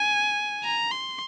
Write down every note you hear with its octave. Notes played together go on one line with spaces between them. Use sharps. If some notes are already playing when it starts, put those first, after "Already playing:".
Already playing: G#5
A#5
C6